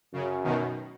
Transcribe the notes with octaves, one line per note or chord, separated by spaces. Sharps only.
F#2 C#3
B2 D#3